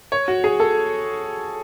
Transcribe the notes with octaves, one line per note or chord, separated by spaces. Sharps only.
C#5
F#4
G#4
A4